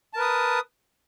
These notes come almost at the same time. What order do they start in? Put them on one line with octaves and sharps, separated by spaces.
A5 A#4 B4 D#6